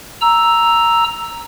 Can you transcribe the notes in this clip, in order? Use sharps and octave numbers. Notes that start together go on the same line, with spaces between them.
A#5 E6